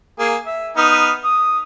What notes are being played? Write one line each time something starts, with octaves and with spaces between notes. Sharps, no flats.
A#3 G#4
E5
B3 D#4 F6
D#6